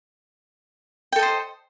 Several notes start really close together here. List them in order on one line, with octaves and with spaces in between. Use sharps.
G5 A4 D#5 C5